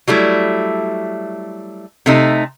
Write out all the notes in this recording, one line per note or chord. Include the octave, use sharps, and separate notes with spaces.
F#3 G3 A3 E4
C3 A3 D#4